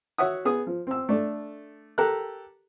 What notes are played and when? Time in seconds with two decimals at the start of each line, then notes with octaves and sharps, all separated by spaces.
0.18 F#4 C#5 E5 F#5 D#6
0.45 B3 G#4 D#6
0.67 F3
0.87 C4 E6
1.09 A3 D4 A4
1.98 G4 A4 A#4 A#5 F#6